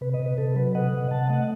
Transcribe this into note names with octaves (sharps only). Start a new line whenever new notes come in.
C3 B4
B4 D#5
C3
B4
C3 A4
F#3 B4
C3 D#5 F#5
C3
C3 F#5 A5
A3 D#5 F#5